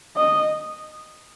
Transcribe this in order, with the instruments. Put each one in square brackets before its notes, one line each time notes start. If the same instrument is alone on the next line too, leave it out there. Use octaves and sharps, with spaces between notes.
[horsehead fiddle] D#5